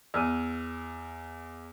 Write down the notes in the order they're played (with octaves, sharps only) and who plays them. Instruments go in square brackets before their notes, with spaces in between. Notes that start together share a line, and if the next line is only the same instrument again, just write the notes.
[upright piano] E2 [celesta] E6 F6 D#7